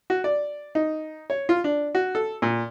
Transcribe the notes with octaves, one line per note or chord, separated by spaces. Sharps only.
F#4
D5
D#4
C#5
F4
D4
F#4
A4
A#2